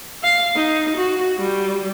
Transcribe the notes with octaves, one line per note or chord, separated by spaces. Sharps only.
F5
D#4
F#4
G3